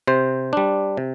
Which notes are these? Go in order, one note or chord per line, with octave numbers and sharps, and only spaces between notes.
C3 C5
G3 D4
C3